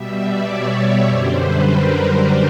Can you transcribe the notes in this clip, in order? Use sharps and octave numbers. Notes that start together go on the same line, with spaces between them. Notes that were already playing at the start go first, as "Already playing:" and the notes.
Already playing: B2 G3 E5
D5
C#5
F#2 D3 G3 C5
B4
A#4
B4